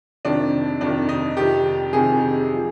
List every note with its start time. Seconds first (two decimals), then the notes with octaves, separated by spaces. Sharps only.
0.25 F2 C3 D#3 D4
0.81 F2 C3 D#3 D4
1.09 D#4
1.37 F2 C3 D#3 G4
1.93 F2 C3 D#3 G#4
2.53 F3